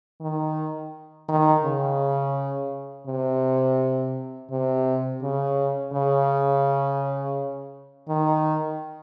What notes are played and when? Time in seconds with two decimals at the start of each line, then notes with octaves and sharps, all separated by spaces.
0.21 D#3
1.29 D#3
1.64 C#3
3.07 C3
4.51 C3
5.22 C#3
5.93 C#3
8.08 D#3